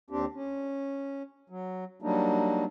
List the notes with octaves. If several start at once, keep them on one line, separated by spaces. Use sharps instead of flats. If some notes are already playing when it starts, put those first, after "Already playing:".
D#2 C4 D4 G4
C#4
F#3
F#3 G3 A#3 D4 D#4